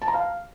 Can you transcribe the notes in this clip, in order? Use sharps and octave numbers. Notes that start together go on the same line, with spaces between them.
A5
A#5
F5